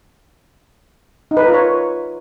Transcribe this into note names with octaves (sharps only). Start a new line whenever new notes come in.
D#4
B4
A#4
F4
C#5